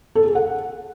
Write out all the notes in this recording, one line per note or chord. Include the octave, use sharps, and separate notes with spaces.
A4
G#4
F#5